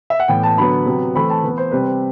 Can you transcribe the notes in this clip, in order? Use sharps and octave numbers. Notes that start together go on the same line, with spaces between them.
E5
F#5
A2 E3 B3 G5
A5
D3 F#3 B3 B5
C3 F#3 B3
E3 A3 C4 B5
A5
E3 B3 B4
C5
C3 G3 C4 B4
C5